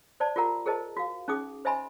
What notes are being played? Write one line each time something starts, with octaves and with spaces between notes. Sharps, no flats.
C5 D5 A5
F4 G4 A#4 F#5 A#5
G#4 A#4 C5 D#5 A5
F#4 F5
C#4 D#4 G#4 D6 D#6
C5 D#5 E5 G#5 B5 C6